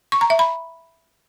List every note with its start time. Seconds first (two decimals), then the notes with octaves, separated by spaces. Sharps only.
0.12 C#6
0.21 A#5
0.30 E5
0.39 B5